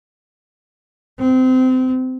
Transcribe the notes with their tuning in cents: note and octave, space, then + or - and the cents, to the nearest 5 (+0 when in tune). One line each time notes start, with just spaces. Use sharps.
C4 -25